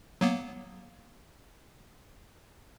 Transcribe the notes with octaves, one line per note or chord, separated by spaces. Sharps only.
F#3 A#3 B3